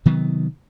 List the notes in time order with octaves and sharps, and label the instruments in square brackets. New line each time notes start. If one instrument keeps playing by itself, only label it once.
[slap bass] C3 D#3 F#3 B3